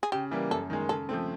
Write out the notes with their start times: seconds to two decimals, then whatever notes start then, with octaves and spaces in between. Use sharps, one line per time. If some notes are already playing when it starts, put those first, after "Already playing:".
0.03 G#4
0.12 C#3 G4
0.31 E3 G3 A#3
0.51 F#2 A4
0.70 D#3 G#3
0.89 C#3 A4
1.09 F3 A3 C4